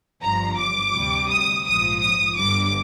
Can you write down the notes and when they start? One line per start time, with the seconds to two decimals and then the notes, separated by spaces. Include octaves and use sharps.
0.22 G1 G2 F3 A#5
0.59 D6
0.94 D2 C3 G3
1.30 D#6
1.65 A#1 G#2 F3 D#6
2.01 D#6
2.37 G1 G2 D3 D6